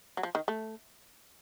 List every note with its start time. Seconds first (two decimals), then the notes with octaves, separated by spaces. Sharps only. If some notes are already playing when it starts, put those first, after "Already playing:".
0.17 F#3
0.23 F3
0.35 D#3
0.48 A3